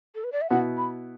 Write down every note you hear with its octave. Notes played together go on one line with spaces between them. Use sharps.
A4
B4
D5
E5
B2 B3 E4 F#5
B5